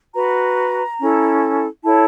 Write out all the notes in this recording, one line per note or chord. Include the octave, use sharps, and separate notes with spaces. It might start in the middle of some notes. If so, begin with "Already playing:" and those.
F#4 B4 A#5
C#4 E4 A4
E4 A4 C#5 A5